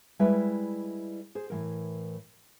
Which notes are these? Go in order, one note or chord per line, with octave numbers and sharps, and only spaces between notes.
G3 G#3 E4 B4 D5 E5
G#4 C5
A2 E3 A#4